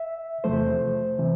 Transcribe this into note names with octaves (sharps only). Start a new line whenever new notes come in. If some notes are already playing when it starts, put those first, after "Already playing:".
Already playing: E5
E2 C3 F3 A3 C5
C3 E3